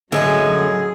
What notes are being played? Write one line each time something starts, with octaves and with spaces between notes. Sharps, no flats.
F#2 A2 D3 F#3 G#3 A#3 D#4 G#4